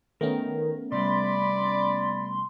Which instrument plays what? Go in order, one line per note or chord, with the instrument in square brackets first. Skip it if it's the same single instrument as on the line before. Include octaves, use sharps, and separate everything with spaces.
[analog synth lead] D#3 [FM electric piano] A3 B3 C#4 [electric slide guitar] A#4
[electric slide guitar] C3 G3 [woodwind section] D5 B5 [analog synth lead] C6